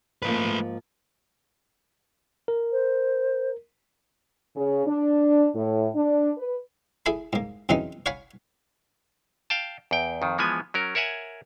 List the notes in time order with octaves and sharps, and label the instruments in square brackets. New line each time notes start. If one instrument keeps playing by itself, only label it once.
[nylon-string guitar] G#2 F3 A#3 [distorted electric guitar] A3 B4
[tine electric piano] A#4
[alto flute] C5
[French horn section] C#3
D4
A2
D4
B4
[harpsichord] E4 G#4 A4 E5 G#5 B5
G#2 A#3
F#2 C#3 E3 C4 C#4 D#4
C#5 F5 F#5 G#5 B5 C#6
[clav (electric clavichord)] F5 G5 A5
E2 G5
F2 D#3
E3 F3 G#3 B3 G#5
F#3 C#4 A#4
A#4 C#5 E5 F#5 G#5